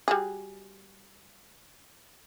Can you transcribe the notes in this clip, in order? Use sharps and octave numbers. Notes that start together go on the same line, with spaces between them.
G3 F#4 G#4